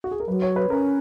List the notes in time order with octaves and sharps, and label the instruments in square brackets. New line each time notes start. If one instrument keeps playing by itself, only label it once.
[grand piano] F#4
G#4
A#4
[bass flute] F#3 [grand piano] B4
[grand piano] C#5
B4
[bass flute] C#4 [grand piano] A#4